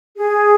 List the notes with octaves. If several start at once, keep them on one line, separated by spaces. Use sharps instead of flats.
G#4